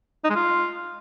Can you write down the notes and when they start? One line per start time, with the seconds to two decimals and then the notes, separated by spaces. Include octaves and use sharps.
0.24 D#4
0.30 G#3
0.35 F4